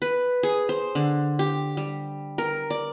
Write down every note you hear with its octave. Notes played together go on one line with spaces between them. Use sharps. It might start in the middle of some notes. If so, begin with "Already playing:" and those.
B4
G#4
C5
D3
G4
G3
A#4
D5